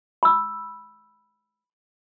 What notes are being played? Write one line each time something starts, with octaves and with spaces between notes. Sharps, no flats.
B5 E6